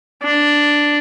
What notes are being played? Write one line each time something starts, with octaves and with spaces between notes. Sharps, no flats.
D4